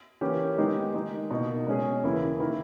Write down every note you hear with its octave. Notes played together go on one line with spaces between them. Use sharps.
E3 A#3 C#4 G4
D#3 G#3 B3 D#4 G4
D#3 G#3 D#4
B2 A#3 D#4
B2 G#3 C#4 G#4
D#2 C#3 E3 A#3 E4
D#3 A#3 E4 A#4